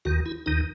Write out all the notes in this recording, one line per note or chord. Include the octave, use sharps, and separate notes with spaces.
D#2 D#3 F#4
E4
D#2 D#3 D#4